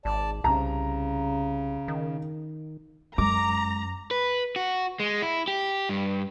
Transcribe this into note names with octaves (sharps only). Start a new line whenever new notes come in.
G#1 D5 A5
C2 C#3 A#5
D#3
F#2 G#3 A#5 D6
B4
F#4
G#3
E4
G4
G2